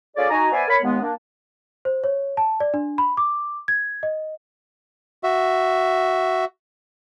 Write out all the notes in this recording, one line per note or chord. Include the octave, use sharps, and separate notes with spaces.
C#4 F4 G#4 A4 C#5 D5
D#4 F#4 G#5 A#5
B3 B4 C5 D5 E5 G#5
A#4 C#5 B5
D#2 G#3 B3
A#3 D4
C5
C#5
A5
D5
D4
B5
D6
G#6
D#5
F#4 E5